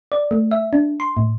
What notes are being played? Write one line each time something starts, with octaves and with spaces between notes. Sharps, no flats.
D5
A3
E5
D4
C6
A2